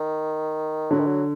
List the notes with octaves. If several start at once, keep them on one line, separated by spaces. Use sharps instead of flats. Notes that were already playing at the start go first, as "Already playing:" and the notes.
Already playing: D#3
D3 F#3
D#3
F#3